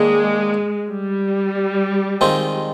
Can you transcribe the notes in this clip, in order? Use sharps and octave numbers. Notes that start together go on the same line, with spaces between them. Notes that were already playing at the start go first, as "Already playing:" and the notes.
Already playing: D#3 G#3 A#3 D4
G3
D#3 G#3 C4 F4